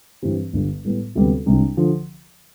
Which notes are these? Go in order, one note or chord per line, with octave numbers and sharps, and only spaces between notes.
G2 E3 G3 C4 G4
G1 G2 D3 G3
A2 G3 B3
D2 C3 G3 B3
C2 C3 G3 D4
D3 F3